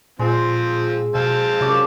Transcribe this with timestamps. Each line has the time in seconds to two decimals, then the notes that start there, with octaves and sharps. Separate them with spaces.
0.19 A#2 F3 G#3 C4
1.15 B2 C4 F5 A5
1.61 F#2 C3 D6